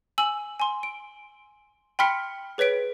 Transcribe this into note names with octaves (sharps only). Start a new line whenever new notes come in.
G#5 E6 F#7
G#5 C6
D7
G5 B5 C6 F6 B6 C#7
G#4 B4 C#5 B6 D7